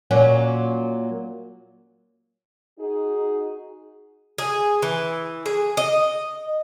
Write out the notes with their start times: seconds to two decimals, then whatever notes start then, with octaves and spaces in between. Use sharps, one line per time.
0.11 A#2 F#3 C#4
2.79 D#4 F#4 G#4
4.38 G#4
4.82 E3
5.46 G#4
5.77 D#5